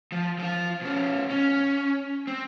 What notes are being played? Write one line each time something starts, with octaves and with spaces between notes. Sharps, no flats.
F3
F3 F4
B2 C#4
C#4
C4